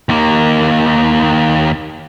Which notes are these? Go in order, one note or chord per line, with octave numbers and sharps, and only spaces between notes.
D#2 A#3